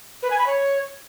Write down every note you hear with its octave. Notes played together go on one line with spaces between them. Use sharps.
B4
G#5
B5
C#5